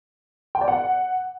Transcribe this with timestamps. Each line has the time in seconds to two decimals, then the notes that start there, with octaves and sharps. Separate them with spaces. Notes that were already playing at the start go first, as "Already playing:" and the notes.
0.55 G5
0.61 D5
0.68 F#5